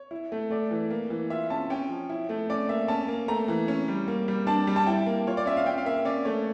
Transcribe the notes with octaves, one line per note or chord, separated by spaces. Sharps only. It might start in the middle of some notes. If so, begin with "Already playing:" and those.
Already playing: C#5
E4
A3
A3 D5
E3
A#3
E3
F4 E5
C#4 A5
C#4 G5
F3
E4
A3
C#4 D5
A#3 E5
C#4 A5
A#3
A3 A#5
E3
C#4
G3
A#3
G3
D4 A5
G3
A5
E4 G5
A#3
F4 C#5
D5
C#4 E5
F5
C#4 G5
F5
A#3 E5
C#4 D5
A3 C#5